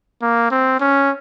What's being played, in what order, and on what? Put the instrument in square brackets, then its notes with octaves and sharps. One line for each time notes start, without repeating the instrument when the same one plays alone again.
[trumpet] A#3
C4
C#4